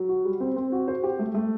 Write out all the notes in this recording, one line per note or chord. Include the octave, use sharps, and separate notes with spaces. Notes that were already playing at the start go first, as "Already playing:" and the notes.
Already playing: F#3
F#4
G3
C4
C4
F#4
C5
G4
A3
A3